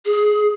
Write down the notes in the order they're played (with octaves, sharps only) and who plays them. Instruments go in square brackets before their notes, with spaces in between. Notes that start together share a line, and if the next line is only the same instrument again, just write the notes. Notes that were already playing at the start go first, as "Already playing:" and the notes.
[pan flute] G#4